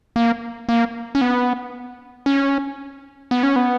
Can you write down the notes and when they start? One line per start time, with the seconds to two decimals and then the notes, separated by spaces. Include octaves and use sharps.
0.16 A#3
0.69 A#3
1.15 C#4
1.21 B3
2.26 C#4
3.31 B3
3.43 C#4
3.56 B3